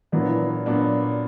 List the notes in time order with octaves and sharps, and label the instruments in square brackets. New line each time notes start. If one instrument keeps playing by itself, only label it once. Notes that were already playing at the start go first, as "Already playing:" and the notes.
[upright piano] A#2 F#3 B3 D4 [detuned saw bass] E3
[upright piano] A#2 F#3 B3 D4